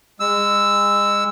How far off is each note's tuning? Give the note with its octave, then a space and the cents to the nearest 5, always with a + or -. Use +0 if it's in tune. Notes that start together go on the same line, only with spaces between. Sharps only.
G#3 -30 E6 +0